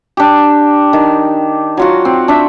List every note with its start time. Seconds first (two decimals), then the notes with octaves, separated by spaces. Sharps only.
0.17 D4 G4
0.93 D#3
1.77 F#3 F4 F#4
2.05 C4
2.28 D4 E5